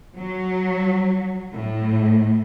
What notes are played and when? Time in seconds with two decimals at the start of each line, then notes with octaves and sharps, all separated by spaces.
0.18 F#3
1.55 A2